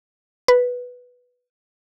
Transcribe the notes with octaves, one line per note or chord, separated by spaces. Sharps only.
B4